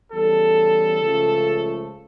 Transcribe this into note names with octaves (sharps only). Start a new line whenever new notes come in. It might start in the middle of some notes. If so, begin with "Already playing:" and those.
E2 C#3 G3 A4
C#2 C#3 F3 A3